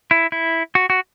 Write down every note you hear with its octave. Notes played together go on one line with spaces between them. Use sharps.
E4
E4
F#4
F#4